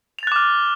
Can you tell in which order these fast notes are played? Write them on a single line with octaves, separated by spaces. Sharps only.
F7 A6 F#6 D6 F6